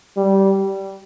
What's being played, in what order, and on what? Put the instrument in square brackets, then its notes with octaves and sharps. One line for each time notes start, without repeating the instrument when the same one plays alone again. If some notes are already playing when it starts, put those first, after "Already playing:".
[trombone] G3